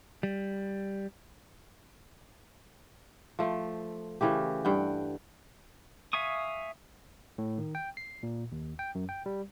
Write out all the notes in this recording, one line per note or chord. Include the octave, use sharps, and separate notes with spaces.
G3
F3 A3
C#3 E3 A3 G4
G2 F#5 G5
E5 F5 G#5 C#6 D#6
A2
D#3
G5
C7
A#2
D#2
G5
F#2
G5
G3